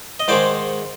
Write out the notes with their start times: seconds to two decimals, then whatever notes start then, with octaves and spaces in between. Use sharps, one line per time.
0.20 D#5
0.28 G#2 D#3 G#3 C5 D5